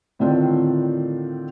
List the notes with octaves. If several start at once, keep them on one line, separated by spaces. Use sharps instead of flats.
A2 D3 D#3 C4 D4 F4